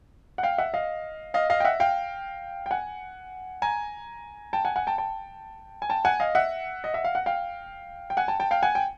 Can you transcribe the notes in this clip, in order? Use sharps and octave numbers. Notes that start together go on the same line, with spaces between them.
F#5
F5 G5
E5 F#5
D#5 F5
D#5 F5
D#5 F5
G5
E5 F#5
F5 G5
G5
F#5 G#5
G#5 A#5
G5 A5
F#5 G#5
F#5 G#5
G5 A5
G5 A5
G#5
G5 A5
F#5 G#5
D#5 F5
E5 F#5
D#5
E5
F5
F#5
F5 G5
G5
F#5 G#5
G5 A5
G5 A5
F5 G5
F#5 G#5
G5